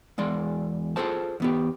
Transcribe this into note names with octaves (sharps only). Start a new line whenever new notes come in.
E2 G#3 D5 C6
F4 G#4 A4 C5 A5
E2 B3 G4